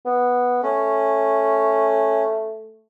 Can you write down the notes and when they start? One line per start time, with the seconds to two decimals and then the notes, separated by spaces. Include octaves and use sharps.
0.05 B3
0.63 A3 C#4